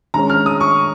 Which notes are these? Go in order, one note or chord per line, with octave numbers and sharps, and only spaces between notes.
D#3 G#3 C#4 A#5
F6
D#6
C#6